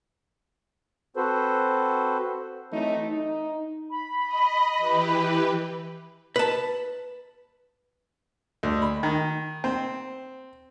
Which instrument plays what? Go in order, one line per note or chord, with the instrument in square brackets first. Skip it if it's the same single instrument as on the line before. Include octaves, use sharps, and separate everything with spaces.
[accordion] C4 F#4 A4 B4 C5
[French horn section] E3 F#3 A3 C4 D#4
D#4
[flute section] B5
[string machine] D#5
E3 G4 B4
[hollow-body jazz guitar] B4 A5
[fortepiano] D2
B5
D#3
C4